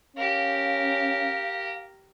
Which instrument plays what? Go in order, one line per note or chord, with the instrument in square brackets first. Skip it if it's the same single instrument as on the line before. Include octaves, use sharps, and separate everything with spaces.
[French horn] C#4 [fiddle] G4 A#4 [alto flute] F5